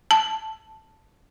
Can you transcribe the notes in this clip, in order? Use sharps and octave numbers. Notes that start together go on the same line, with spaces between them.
A5